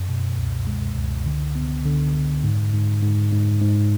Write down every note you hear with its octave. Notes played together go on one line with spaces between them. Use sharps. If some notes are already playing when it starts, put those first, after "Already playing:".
Already playing: F#2
B2
C#2
G#3
C#2
D3
B3
D3
D3
G#2
G#2
G#2
G#2
G#2